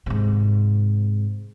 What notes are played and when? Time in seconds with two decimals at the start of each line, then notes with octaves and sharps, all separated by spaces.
0.06 G#2 C3